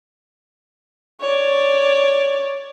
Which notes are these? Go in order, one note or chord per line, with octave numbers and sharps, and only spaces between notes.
C#5 D5